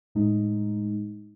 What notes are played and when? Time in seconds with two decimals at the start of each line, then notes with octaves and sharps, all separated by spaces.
0.15 A2 G#3 D#4